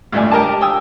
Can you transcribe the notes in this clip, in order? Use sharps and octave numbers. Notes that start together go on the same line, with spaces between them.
C#2 G2 A3 D4 G#5
G4 A#4 D#5 A5
G5 G#5 D#6 E6